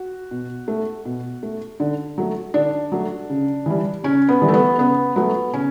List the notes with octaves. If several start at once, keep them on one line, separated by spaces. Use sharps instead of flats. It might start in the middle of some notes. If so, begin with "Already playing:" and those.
Already playing: F#4
B2
A3
B2
A3
D3
F#3 A3
D3 D4
F#3 A3
C#3
E3 G3
C#3 C#4
B3
E3 G3
A3
B3
C#3 B3
F#3 A3 B3
C#3 C#4